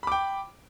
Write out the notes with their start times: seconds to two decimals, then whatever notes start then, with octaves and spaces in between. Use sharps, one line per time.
0.03 B5
0.07 D6
0.12 G5